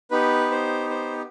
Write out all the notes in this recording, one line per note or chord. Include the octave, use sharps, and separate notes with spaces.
B3 D#4 G4 B4
C5
C5